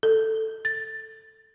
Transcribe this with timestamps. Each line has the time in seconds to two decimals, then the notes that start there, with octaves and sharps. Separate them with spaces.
0.03 A4
0.65 A6